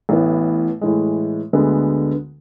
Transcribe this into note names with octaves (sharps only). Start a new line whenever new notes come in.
A1 A2 E3 B3
A2 E3 G#3
D2 D3 G#3 B3